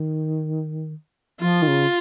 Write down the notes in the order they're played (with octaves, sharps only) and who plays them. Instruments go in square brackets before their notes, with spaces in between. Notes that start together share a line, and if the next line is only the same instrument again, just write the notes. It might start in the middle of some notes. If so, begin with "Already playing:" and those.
Already playing: [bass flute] D#3
[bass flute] F3 [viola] F4
[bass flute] D#3
C#3